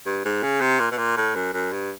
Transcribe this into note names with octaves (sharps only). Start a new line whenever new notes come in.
G2
G#2
C#3
C3
A#2
B2
A#2
A2
F#2
F#2
G2